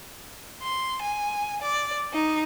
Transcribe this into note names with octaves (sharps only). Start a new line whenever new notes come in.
C6
G#5
D5
D#4